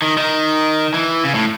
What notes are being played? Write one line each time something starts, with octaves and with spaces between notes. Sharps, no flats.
D#3
D#3
E3
C#3
A2